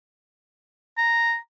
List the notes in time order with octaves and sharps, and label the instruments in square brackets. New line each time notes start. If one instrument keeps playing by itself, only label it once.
[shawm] A#5